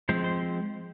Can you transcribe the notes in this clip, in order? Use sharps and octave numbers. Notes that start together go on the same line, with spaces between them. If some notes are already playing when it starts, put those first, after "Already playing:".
F3 G#3 C4 C5
C5